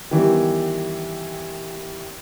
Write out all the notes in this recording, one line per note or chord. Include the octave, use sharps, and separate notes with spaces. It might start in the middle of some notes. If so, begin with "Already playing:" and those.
D#3 E3 G3 B3